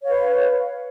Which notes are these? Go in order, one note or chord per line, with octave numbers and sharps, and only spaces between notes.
B4 C#5 F5